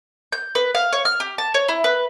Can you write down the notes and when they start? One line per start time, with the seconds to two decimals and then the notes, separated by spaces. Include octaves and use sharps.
0.32 G6
0.55 B4
0.75 F5
0.93 C#5
1.05 F6
1.20 G4
1.38 A5
1.54 C#5
1.68 E4
1.84 B4